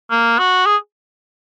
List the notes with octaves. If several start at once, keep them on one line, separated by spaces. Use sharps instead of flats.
A#3
F#4
G#4